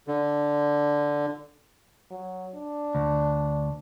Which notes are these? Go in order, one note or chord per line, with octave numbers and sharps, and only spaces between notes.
D3
F#3
D4
D2